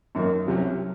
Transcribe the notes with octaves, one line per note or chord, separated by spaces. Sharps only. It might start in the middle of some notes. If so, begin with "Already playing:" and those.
F#2 D#3 A#3 D#4
C2 C3 F#3 C#4